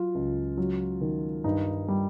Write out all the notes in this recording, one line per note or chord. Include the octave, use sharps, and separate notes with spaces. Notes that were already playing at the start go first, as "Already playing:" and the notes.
Already playing: F#3 F4
C#2
F#3
D#3
G2 D#4
G3